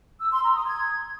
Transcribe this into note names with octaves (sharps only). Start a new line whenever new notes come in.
E6
C6
A#5
D#6
G#6